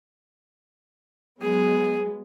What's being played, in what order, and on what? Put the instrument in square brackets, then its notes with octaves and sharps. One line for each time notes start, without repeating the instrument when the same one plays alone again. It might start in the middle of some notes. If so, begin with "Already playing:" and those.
[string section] F#3 G#3 B3 [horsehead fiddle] G#4